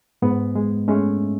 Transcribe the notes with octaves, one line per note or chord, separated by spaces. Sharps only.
G#2 B3
G#3
G#3 A3 C#4